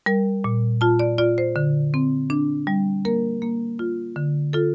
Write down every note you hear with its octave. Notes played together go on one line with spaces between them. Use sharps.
G3 A#4
A#2
F4 A5
D5
F4 D5
C5
D3
C4
D4
G3
A#3 A#4
A#3
F4
D3
F4 A4